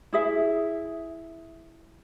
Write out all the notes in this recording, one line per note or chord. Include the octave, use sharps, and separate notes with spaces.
E4 G#4 E5